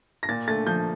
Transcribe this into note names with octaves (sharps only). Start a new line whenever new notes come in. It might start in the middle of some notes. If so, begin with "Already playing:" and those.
A#6
A#2 A6
A3 A6
F3 G6